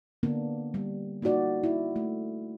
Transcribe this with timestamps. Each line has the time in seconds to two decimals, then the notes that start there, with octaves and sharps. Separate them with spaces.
0.23 D3 A#3 B3 D4
0.74 G3
1.22 A#3 D#4 F4 F#4 D5
1.63 E4
1.96 A3